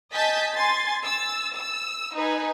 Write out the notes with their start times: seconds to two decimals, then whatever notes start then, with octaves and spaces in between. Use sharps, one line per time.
0.13 D#5 G#5 A5 G6 A6 B6
0.53 G#5 C6 A6
1.04 E6 A6
1.55 E6
2.15 D#4 B4 G#5